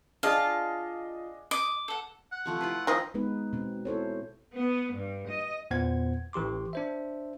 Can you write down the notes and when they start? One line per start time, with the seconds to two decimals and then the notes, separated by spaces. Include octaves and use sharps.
0.23 D4 F4 G#4 D#5 F5 A5
1.51 D#5 D6
1.88 A4 F#5
2.32 F#5
2.46 C3 F3 A3
2.61 E4 F4 B4
2.87 D#3 F3 D#5
3.14 G#3 B3 D#4 B4
3.53 B2 C4
3.85 E4 A4 C5 C#5
4.55 B3
4.93 G2
5.28 D#5
5.71 E2 A#2 B3 C5 F#5 G#6
6.33 A1 E3 G4 C6 D6
6.73 D4 C5 E5